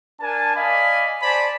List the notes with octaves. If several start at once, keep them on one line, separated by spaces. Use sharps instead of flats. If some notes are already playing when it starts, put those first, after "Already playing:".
D4 A#4 G#5 A5
D5 D#5 F5 G#5 B5
C5 D5 G#5 A5 B5